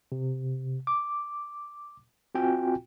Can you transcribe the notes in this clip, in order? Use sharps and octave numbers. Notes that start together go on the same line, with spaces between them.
C3
D6
C4 F4 F#4 G5 G#5